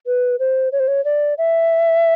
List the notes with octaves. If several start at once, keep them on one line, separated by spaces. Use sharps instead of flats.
B4
C5
C#5
C5
C#5
D5
E5